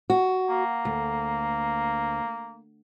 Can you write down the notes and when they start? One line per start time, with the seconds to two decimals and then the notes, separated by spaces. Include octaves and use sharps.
0.10 F#4
0.49 A#3
0.85 D2